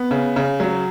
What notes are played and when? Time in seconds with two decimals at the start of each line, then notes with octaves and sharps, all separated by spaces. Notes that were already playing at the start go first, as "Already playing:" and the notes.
Already playing: B3
0.11 C#3
0.36 C#3
0.60 F#3